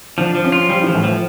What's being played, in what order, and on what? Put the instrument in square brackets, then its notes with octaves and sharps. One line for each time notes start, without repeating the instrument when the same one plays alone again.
[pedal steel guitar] F3 [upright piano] D4
[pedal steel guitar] F3
[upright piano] C#4
[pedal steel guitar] F4
[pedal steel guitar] F3 [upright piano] G3
[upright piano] E3 [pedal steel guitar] F3
[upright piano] A2
[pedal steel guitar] F3